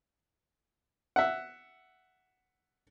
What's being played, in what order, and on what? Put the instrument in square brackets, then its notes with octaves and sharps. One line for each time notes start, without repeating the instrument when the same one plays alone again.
[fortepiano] E5 F#5